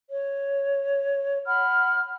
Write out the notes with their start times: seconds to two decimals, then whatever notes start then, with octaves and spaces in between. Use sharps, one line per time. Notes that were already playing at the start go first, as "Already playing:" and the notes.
0.09 C#5
1.47 F#5 B5 F6